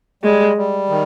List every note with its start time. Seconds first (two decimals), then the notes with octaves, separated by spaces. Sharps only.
0.23 G3 G#3
0.57 G3
0.89 D#3